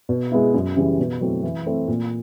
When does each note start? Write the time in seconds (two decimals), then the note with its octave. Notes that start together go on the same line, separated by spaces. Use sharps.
0.09 B2
0.31 G#3 B3 E4
0.54 F#2
0.76 C#3 E3 G3
0.99 B2
1.21 F#3 A3 C4 E4
1.43 E3
1.66 A3 C4 E4
1.88 A#2